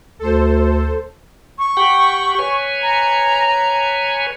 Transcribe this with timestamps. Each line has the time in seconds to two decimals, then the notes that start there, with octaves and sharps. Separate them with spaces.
0.19 D2 A4 C5
1.58 C#6
1.77 G4 F#5 G5
2.39 B4 C#5 G#5
2.82 A#5